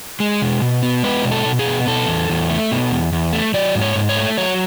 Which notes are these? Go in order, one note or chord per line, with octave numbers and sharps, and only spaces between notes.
G#3
B2
B2
B3
G#3 B4
B2
A4
B2
G#4
B3
B2 A4
E2
E2
A3
B2
E2
E2
A3
F#3 D5
G#2
C#5
G#2
C#5
A3
F#3 C#5